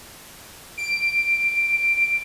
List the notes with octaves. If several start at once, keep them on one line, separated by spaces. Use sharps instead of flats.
D7